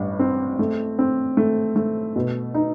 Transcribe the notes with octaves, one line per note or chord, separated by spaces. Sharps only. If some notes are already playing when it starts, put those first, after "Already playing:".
Already playing: A1 G2
C4
A3
C4
A3
A3
B2
D#4